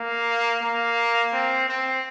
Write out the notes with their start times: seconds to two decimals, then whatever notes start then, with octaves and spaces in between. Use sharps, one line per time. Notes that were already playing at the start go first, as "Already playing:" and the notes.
Already playing: A#3
0.63 A#3
1.33 C4
1.69 C4